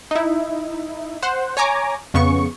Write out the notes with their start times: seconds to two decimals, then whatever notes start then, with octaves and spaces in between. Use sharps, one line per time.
0.11 D#4 E4
1.23 C5 F#5
1.57 C#5 G#5 A#5 D6
2.14 F2 C#3 B3 C#6